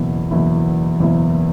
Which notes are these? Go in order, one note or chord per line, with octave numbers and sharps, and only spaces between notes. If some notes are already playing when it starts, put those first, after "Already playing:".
Already playing: F#1 E2 B2 A#3 E4
F#1 E2 B2 A#3 E4
F#1 E2 B2 A#3 E4